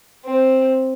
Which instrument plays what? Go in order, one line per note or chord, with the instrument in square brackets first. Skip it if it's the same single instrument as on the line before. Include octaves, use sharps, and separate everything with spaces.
[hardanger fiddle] C4